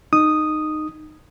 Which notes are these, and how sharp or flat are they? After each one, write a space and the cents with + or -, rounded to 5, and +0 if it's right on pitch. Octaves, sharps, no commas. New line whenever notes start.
D#4 -15 D#6 -5